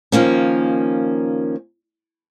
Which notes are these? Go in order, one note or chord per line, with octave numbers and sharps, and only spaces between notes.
D#3 F3 A#3 C#4